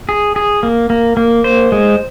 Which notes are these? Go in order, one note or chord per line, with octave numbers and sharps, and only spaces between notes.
G#4
G#4
A#3
A#3
A#3
C5
G#3